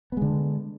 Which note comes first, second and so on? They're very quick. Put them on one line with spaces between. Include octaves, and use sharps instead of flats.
B3 G#3 D3